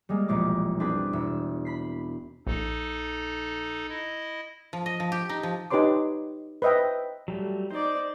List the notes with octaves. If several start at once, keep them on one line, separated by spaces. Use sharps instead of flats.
G3 G#3 A#3
E1 A#1 C4 D6
C4 D4 G#4 B4
E1 E6
B5 B6 C7
A#1 D#4 A4
E4 D#5
F3
D#5
F3
G4
D#4
F3
D#4 G4 B4 C#5 C6 D6
B4 C5 D#5 E5 G5
F#3 G3 A3
D#4 C5 D5